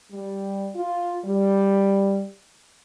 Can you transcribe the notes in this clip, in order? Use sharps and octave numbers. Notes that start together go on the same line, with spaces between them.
G3
F4
G3